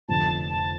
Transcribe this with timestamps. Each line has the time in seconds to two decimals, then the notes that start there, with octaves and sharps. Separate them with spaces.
0.09 F1 F2 D3 A5
0.50 A5